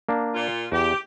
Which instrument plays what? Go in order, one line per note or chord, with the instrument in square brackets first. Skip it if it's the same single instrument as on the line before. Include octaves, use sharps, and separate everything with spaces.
[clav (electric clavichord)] A#3 D4
[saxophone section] A#2 F4
[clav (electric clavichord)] E2 [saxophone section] G4